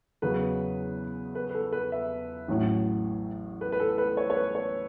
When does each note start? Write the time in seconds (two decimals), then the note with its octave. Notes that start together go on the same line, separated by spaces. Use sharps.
0.22 E2 C#3 F#3 B4
1.35 B4
1.50 B4
1.55 A4
1.73 B4
1.92 E5
2.48 A1 A2 F#3
3.61 B4
3.72 B4
3.80 A4
3.98 B4
4.17 C#5
4.30 C#5
4.36 B4
4.55 C#5